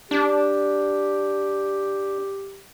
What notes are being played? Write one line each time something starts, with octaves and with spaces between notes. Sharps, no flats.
D4 G4